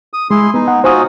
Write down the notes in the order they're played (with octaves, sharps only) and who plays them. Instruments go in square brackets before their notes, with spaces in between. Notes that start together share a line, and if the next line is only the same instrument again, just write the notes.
[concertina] D#6
[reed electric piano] G#3 [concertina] E4 G#4 C6
[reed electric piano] B3 [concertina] D#4
[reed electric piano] F#5
[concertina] D#4 F4 F#4 [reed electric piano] C5 G#5 D#6